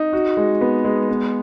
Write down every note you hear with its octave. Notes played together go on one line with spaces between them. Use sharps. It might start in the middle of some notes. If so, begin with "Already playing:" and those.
Already playing: D#4
F#4
G#3
B3
G#3
B3